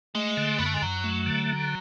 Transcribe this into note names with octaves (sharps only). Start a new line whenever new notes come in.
G#3 A3
D3
F#2 B3
A3
G#3
F#2 F#3
A3
D3